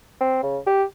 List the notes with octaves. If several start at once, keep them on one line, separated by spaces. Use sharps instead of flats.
C4
C#3
G4